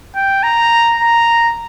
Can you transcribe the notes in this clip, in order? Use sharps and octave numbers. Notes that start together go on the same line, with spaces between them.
G5
A#5
A#5